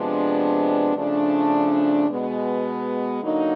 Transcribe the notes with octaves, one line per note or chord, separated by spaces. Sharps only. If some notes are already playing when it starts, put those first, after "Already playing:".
Already playing: C3 F3 G#3 B3 D4
C#3 F3 A3 D4
B2 G#3 B3
D3 F#3 A#3 D#4